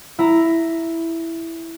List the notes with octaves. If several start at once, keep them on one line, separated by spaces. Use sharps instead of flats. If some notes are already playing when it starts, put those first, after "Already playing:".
E4 A#5